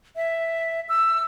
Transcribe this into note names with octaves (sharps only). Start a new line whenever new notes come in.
E5
E6